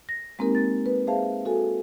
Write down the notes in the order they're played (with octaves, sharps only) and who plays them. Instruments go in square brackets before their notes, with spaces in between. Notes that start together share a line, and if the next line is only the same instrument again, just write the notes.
[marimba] A#6
G#3 A#3 C4 D#4 G4 A#4
A6
B4
G#4 C5 E5 F5 A5
F#4 A4 G#5